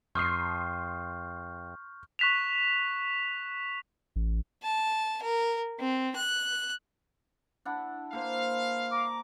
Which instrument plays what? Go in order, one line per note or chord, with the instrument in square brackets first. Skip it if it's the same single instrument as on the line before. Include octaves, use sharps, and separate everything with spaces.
[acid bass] F2 [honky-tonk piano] C6 D#6 C7 [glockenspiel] C#6 F6 G6
[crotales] C#6 F#6 B6 E7 F7
[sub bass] A1
[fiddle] A5
A#4
C4
F#6
[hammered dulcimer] D4 E4 F#5
[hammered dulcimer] A#3 A#4 C5 [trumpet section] F5
[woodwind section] A#5 D6